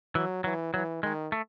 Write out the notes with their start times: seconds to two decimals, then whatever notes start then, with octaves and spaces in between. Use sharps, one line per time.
0.15 E3 F#3
0.44 E3 F#3
0.74 E3 F#3
1.03 D#3 G#3
1.32 A3